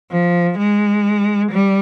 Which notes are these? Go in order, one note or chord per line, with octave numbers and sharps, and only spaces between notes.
F3
G#3
G3